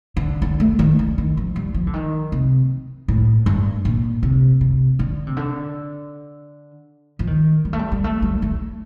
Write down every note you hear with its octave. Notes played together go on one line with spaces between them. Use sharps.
D3
D3
A3
D#3
D3
D#3
F3
G3
F3
D3
D#3
C3
A2
G2
A#2
C3
C3
D3
C3
D3
F3
D#3
G3
A3
G3
G3
A3
G3
A3